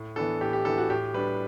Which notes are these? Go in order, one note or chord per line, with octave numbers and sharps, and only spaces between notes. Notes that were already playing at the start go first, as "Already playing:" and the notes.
Already playing: A2
E3 B3 D4 A4
A2 G4
G4
E3 B3 D4 A4
F#4
A2 G4
G3 D4 B4